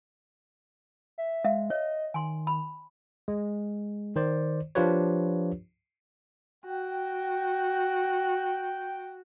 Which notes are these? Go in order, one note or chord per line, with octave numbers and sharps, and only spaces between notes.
E5
G#3 E5 F5
C#5 D#5
D#3 G#5 C6
B5
G#3
D#3 C5 D5
F3 D4 F4 G4 B4 C#5
F#4 G5